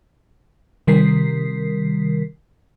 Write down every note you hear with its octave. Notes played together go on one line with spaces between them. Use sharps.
C3 D#3 G3 A#4 B6 C7